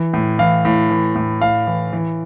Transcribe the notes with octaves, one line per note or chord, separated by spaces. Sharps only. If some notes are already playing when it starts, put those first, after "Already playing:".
Already playing: E3
A2
E3 F5
A2
E3
A2
A2 F5
E3
E3